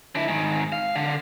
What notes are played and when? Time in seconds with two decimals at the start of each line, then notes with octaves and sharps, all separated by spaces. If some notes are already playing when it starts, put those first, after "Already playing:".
0.15 D3 E4
0.28 G#2 D#3
0.72 F5
0.96 D3